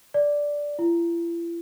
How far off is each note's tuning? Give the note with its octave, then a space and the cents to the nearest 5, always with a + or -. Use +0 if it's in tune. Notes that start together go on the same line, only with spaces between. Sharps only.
D5 -5
E4 +45